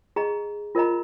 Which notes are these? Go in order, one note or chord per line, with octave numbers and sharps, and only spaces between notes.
G#4 D#5 A#5
F4 A#4 D#5 A#5